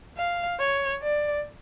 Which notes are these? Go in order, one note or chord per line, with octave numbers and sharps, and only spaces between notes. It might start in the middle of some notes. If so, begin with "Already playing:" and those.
F5
C#5
D5